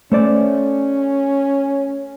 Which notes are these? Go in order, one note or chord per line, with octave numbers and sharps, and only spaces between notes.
A3 C#4 C5 D5